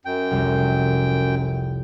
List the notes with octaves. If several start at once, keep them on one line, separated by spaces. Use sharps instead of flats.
F#2 G5
F1 C2 G3